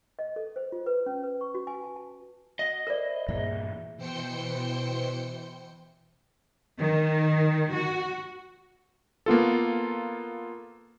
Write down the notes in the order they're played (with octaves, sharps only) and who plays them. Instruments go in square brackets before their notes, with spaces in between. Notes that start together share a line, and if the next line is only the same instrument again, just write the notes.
[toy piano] D#5
A4
C5
F4
B4
C#4
B4
C#6
F#4
G#5
A5
A5
[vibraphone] F#4 F#5 [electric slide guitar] D#5
[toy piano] A#4 D5 [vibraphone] C5 E5 B5
[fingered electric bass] G2 A#2 E3 [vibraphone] A#3 G#4 E5
[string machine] B2 E3 C5 G5 C6 C#7
[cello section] D#3
F#4
[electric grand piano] A#3 B3 F4 A4